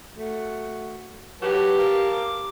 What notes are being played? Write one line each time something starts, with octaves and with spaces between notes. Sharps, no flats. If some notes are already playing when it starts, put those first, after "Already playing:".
A3 F#4
F#3 G4 B4 A5
A#4 F5 A5
D6